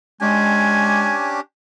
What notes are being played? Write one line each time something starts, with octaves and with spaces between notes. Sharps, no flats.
G#3 C#4 D4 G4 G#5